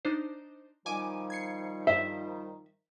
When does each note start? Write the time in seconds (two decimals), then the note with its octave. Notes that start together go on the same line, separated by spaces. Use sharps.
0.05 D4 D#4 C5
0.86 D#3 F3 G3 G#5 D6 D#7
1.30 G#6 C7 C#7
1.87 G2 C5 E5